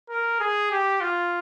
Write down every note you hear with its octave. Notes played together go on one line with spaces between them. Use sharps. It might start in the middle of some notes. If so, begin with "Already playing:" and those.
A#4
G#4
G4
F4